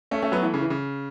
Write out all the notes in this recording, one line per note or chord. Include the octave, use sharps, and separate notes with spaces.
A3 C#4
A3 C#4
F#3 B3
E3 A3
C#3
E3
C#3